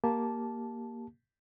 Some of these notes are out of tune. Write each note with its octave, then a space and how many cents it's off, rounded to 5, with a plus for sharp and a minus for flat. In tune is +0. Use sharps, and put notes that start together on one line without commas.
A#3 +5 G4 +0 A5 -10